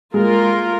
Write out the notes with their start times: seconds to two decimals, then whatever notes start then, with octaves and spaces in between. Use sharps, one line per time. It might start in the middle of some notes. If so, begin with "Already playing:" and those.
0.13 G#3 A#3 F4 A#4